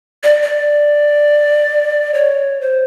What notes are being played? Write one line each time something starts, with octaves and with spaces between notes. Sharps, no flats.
D5
D5
C#5
C5